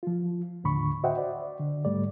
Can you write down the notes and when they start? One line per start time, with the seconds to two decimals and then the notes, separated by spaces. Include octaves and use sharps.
0.03 F3 F4
0.64 D#2 A2 D3 B5 C#6
1.04 F#4 C5 D#5 E5 F#5 G5
1.18 D5
1.59 D3
1.85 G#2 G3 A3 D5